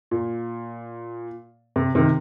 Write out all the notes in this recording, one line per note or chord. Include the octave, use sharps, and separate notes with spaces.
A#2
C3
C3 D#3